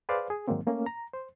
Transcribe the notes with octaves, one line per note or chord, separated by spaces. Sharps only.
G#4 B4 C5 D5 F5
G#4
G#2 D#3 F#3 G#3 A#3 C4
A3 A#3 C#4
A#5
C5